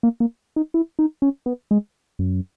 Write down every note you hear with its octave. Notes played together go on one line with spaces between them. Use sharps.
A#3
A#3
D#4
E4
D#4
C#4
B3
G#3
F#2